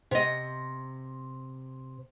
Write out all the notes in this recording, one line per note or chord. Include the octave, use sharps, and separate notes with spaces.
C3 D#5